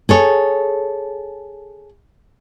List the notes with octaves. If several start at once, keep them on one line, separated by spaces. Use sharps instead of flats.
G#4 A4 C#5